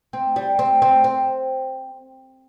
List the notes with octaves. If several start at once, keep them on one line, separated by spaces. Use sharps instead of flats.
C4
G3
C4
C4
C4